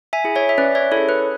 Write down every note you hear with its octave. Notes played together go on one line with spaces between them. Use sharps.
E5 G#5
E4 G#4
C#5 E5
E5
C#4 B4 D5
C#5 E5
E4 G#4 A4 C#5
B4